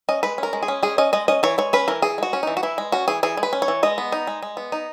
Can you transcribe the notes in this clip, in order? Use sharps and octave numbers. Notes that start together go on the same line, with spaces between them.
C#4 D#5
G#3 B4
C#4 A#4
G#3
G#4
C#4
G#3 G#4
C#4 D#5
G#3 D#5
C#4 D#5
E3 C#5
G#3 C#5
C#4 B4
E3 A#4
E3 G#4
G#3 F#4
C#4
E3 D#4
F#4
E3 E4
G#3
C#4 F#4
E3 G#4
E3 G#4
G#3
B4
C#4
C#5
E3
G#3 D#5
B3
D#4
G#3
G#3
B3
D#4